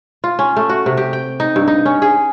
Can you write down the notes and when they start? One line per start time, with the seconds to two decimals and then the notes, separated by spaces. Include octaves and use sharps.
0.24 F4
0.39 C#4
0.56 A3
0.69 F#4
0.86 C3
0.97 G4
1.13 G5
1.40 D#4
1.56 G2
1.68 D#4
1.85 C#4
2.02 G#4